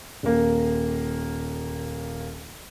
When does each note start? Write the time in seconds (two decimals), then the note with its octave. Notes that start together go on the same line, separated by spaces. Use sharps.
0.23 D#1 A#3